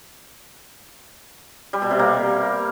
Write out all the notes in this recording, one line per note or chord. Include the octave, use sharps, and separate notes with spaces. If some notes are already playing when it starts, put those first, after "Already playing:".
G3
B2
C3
A#3